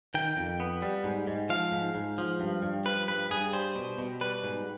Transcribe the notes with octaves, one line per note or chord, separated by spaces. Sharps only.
D#3 G5
F2
B3
G3
G#2
G#2
F3 F5
G#2
G#2
F3
G2
G2
F3 B4
G2 B4
G2 G#4
G3 C5
B2
B2
G3 B4
G#2